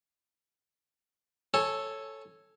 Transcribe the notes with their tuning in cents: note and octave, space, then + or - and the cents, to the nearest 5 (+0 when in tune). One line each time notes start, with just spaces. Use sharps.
A4 +0 C#5 -10 G#5 +20